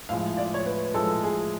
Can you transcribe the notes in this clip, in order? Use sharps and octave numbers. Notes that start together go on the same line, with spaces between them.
A2 F3 G#3 F5
D5
C#5
B4
A2 F3 G#3 A4
G#4